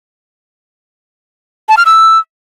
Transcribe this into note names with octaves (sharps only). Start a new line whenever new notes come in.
A5
F6
E6